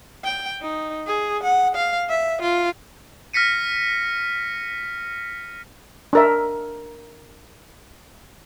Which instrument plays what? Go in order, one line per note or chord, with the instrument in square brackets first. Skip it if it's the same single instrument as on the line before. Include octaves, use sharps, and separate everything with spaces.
[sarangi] G5
D#4
G#4
F#5
F5
E5
F4
[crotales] F6 A#6 B6 C#7 D#7
[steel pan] D4 A#4 E5